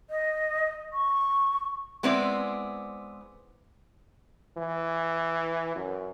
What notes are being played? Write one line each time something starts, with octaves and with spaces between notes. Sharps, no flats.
D#5
C#6
G#3 B3 C4 E4 D5
E3
F#2